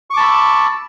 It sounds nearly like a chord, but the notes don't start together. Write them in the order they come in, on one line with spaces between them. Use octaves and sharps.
C#6 D6 A5 B5 E6